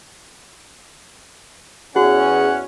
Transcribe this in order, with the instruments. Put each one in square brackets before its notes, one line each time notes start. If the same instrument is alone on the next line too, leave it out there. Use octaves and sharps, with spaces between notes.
[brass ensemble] E2 C#4 [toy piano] F#4 [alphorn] G#4 [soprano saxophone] F#5